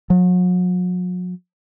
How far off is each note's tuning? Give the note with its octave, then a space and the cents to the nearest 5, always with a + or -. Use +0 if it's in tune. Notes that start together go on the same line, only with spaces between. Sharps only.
F#3 -40